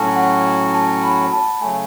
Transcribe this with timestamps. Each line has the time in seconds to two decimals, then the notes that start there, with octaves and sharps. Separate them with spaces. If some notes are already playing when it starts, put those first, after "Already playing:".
Already playing: A2 F#3 C#4 F#4 A5
0.16 F#5
0.74 A5
1.03 B5
1.33 A5
1.61 C#3 F#3 A3 G#5